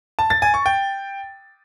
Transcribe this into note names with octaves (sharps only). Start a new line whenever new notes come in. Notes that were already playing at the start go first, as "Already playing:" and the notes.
A5
A6
G#5
C#6
G5